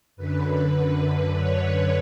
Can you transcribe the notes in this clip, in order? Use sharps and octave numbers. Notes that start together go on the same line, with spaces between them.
F#2 D3 B4
C#5